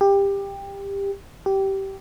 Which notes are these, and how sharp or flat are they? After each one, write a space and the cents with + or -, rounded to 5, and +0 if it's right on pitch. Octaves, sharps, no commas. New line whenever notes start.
G4 +20
G4 -15